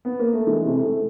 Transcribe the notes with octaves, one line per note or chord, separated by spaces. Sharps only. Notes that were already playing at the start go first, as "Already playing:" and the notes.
B3
A#3
A3
E3 G#3
C3 A3
C3 A3